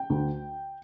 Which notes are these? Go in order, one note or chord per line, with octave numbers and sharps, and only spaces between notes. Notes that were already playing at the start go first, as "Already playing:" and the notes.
Already playing: G5
D2